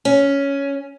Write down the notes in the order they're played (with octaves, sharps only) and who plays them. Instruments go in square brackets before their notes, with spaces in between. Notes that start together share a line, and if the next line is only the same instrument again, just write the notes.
[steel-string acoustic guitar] C#4